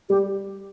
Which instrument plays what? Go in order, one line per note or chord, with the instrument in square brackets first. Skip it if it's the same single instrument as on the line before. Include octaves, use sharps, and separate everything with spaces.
[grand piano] G3 [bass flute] G4